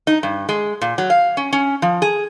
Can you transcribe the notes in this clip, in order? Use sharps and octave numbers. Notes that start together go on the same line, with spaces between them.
D#4
G2
G#3
A#2
F#3
F5
C#4
C#4
F3
G#4